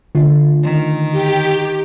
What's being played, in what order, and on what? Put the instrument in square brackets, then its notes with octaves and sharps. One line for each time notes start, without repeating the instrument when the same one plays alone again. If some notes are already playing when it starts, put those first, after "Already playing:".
[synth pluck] D3 A3 F4
[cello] D#3
[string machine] G4